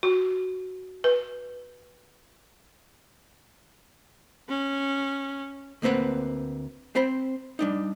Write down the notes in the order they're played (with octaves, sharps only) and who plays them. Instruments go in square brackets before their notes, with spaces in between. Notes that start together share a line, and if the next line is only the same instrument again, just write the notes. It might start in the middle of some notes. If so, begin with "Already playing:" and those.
[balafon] F#4
B4
[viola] C#4
[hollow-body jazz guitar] D2 A#3 C4 B4 F#5
C4 C5 B5
G3 D4 D#4